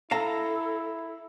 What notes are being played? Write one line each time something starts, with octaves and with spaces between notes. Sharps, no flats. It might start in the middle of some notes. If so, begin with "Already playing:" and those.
E4 A4 F5 A5 A#5